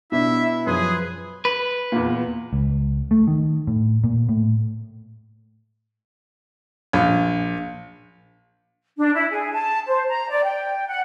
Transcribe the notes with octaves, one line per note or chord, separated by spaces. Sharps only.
B2 D4 E4 E5
F#2 F3 G#4 B4 C6
B4
E2 A#2
C#2
A3
D#3
A2
A#2
A2
A#1
D4
E4
G#4
A5
C5
A#5
D5
G5
F#5